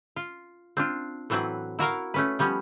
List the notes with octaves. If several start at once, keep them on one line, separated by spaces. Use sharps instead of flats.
F4
C4 D4 F4
A2 E3 F#3 C4 B4 F#5
E4 F#4 A#4 F5
A3 C#4 B4
F3 G3 B3 C#4